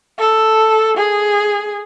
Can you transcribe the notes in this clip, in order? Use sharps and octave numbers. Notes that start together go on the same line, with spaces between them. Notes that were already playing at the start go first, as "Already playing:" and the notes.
A4
G#4